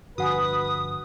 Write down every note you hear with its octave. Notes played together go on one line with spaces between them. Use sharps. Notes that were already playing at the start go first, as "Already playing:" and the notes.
G2 D3 F3 F#4 B4 F#5 G#5 D#6